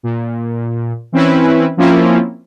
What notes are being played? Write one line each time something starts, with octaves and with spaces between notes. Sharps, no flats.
A#2
E3 C4 C#4 E4 B4
F3 A#3 C4 C#4 E4 F4